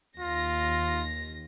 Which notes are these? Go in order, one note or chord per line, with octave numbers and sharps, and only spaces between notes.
D#2 F4 A#6